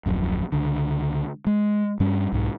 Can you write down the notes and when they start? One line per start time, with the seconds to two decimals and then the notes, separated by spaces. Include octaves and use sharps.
0.06 D#1 A#1 F#2
0.52 C#2 D3
1.47 G#3
2.00 G2 G3 C#4
2.32 B1 G#2